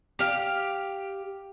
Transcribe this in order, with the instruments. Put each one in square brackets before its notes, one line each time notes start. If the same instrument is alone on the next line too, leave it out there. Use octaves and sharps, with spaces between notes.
[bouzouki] G4 F5